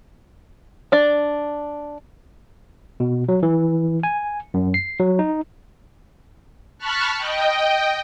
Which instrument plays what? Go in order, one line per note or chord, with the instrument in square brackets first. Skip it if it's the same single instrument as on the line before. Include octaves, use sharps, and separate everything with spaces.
[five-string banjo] D4 D5
[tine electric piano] B2
F#3
E3
G#5
F#2
C7
F#3
D#4
[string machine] A5 B5 C#6 F6 F#6
D#5 G5